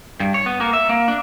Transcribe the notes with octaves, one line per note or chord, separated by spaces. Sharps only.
G2
C#5
B3
A#3
E5
A#3
D4